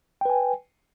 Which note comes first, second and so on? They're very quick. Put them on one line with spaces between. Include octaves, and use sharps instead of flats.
G5 B4 G#5